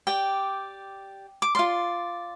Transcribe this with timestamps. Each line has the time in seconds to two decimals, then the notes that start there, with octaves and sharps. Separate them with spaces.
0.07 G4 D5 G5
1.42 D6
1.55 F4 D5 C6